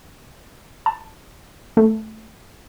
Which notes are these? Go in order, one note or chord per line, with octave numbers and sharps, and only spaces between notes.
A5
A3